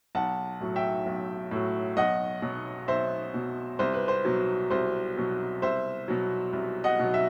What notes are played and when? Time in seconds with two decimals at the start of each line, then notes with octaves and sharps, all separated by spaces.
0.15 B1 F#5 A5
0.61 A2 F#3
0.76 E5 G5
1.06 B1
1.51 A2 F#3
1.97 B1 D#5 F#5
2.42 B2 F#3
2.88 B1 C5 E5
3.34 B2 F#3
3.79 C2 C5
3.93 B4
4.08 C5
4.25 B2 F#3
4.70 C2 C5
5.17 B2 F#3
5.62 C2 C5 E5
6.08 B2 F#3
6.53 C2
6.84 D#5 F#5
6.99 B2 F#3
7.14 E5